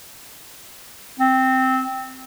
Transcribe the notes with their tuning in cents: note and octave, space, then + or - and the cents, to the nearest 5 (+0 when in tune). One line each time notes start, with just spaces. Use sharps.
C4 -5